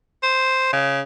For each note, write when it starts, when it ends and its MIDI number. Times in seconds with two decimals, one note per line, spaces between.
0.23 0.69 72
0.73 1.00 49